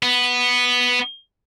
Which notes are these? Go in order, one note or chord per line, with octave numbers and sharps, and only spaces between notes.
B3